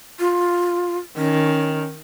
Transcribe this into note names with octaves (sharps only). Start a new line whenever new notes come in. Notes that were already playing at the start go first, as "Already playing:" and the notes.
F4
D#3 C#4